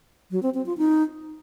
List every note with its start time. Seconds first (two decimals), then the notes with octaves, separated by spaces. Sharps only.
0.31 F#3
0.43 C4
0.54 C4
0.66 F4
0.78 D#4